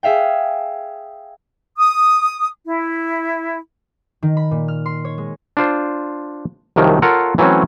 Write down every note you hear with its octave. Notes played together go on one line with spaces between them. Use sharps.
G#4 E5 F5 G5
D#6
E4
D#3
B5
A#2
F6
C6
C#5
G#3
D4 F4 C5
C2 C3 D#3 F3 F#3
F4 A4 A#4 C#5 F5 F#5
E3 F#3 A3 C4 C#4